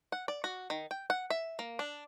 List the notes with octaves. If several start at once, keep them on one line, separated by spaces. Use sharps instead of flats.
F#5
D5
F#4
D#3
G5
F#5
E5
A#3
D4